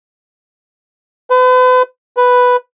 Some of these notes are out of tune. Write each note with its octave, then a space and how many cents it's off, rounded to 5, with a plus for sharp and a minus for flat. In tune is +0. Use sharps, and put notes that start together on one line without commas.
B4 +40
B4 +0